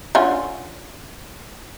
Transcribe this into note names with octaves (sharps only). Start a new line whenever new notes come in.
D3 C#4 F4